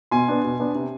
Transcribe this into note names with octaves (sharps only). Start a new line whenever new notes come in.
B2 G#5 C6
B3 D4
B2
B3 D4
C3